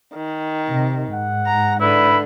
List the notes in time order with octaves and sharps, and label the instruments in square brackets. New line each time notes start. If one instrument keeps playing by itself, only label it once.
[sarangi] D#3
[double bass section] C3
[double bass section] G#2 [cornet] F#5
[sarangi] A#5
[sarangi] D3 [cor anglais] E4 [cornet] B4